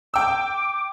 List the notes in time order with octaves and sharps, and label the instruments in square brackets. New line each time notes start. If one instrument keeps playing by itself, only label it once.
[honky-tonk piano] G5 E6 [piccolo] D6